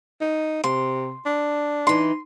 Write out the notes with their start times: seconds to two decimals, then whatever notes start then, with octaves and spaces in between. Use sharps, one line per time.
0.21 D#4
0.64 C3 C6
1.26 D4
1.87 E3 D#4 C6